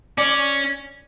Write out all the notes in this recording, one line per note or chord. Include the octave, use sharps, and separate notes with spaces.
C#4 D5